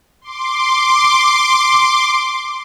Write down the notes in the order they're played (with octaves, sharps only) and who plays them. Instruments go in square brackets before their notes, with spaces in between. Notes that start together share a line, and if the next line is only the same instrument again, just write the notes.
[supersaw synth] C6 D6